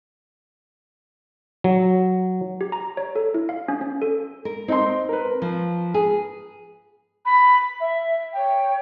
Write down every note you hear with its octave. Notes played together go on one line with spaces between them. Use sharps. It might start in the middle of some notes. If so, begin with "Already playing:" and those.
F#3
G4
A#5
C#5
A4
E4
F5
C#4
C#4
A4
A#4
C4 D#4 C6
A#4 B4
F3
G#4
B5
E5
C#5 G5